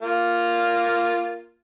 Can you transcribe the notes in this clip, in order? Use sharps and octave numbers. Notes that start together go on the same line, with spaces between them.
A#3 F4